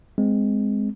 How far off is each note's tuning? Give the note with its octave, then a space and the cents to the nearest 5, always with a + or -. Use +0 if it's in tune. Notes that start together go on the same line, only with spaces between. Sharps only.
G#3 +0 C4 -15